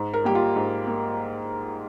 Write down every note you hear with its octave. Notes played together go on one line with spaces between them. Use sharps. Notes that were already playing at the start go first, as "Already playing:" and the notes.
Already playing: G#2
A#4
G3 A#3 G4
F4
G#2
A#3